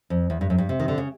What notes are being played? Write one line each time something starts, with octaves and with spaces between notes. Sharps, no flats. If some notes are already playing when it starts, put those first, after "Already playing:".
F2
E2
G2
F#2
G2
C3
D#3
D3
C#3